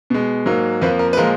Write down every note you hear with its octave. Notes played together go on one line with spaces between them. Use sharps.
B2 G#3
G#2 F#3 A#3
F2 F3 A#3 B4
A#4
B4
A#2 F3 G#3 A#4